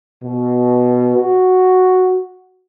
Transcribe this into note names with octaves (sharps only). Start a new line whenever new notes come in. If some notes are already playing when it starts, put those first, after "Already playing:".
B2
F#4